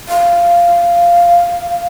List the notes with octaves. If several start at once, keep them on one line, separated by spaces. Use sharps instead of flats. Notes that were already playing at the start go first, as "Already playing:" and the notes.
F5